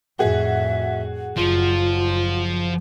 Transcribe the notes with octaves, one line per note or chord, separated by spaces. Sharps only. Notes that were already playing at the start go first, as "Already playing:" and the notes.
F2 A2 F#4 G#4 E5
F#1 F3 F4